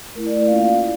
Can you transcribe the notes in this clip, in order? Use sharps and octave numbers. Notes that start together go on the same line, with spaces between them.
A3 E4 A#4
D5
D5
A#3 C#4 F4 F5
F5
E4